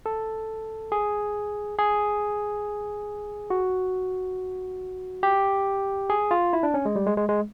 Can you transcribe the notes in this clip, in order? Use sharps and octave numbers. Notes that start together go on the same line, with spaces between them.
A4
G#4
G#4
F#4
G4
G#4
F4
E4
D4
C#4
G#3
G3
G#3
G#3
G#3